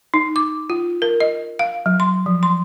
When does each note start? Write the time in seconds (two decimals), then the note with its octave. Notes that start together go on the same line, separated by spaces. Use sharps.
0.14 D#4
0.36 D6
0.70 F4
1.02 A#4
1.20 D#5
1.59 F5
1.86 F#3
2.00 C6
2.26 F3
2.43 C6